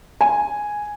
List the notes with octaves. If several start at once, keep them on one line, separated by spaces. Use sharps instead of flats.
G#5